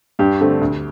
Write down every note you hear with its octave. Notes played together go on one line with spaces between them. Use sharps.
G2 G4
D3 A3 C4
D2